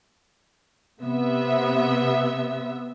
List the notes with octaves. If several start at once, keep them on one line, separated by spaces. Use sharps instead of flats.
C3 B3 E5